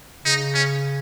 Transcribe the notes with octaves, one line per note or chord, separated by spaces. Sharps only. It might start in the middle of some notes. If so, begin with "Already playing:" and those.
C#3 D#4
C#4